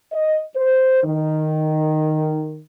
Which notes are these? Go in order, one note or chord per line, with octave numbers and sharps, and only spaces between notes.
D#5
C5
D#3